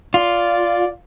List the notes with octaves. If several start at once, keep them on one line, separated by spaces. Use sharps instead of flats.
F4 D5